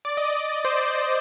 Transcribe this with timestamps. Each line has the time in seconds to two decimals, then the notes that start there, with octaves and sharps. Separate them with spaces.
0.05 D5
0.17 D#5
0.30 D5
0.65 C5
0.73 D5